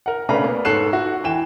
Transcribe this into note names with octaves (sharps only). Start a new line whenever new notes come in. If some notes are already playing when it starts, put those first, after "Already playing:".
A#4 F#5
C#3 A3 D4 B4 A#5
A#3 B3
G#2 A4 C#5 F#6 C7 E7
F#4
E3 G5 E7